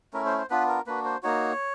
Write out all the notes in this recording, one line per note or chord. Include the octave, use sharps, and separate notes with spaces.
A3 C#4 E4 A#4
C5
C5
B3 D4 F4 B4
A#4
A#3 D4 F#4 B4
C5
A#3 D#4 F#4 C#5